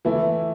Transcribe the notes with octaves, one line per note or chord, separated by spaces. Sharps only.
E3 A3 E4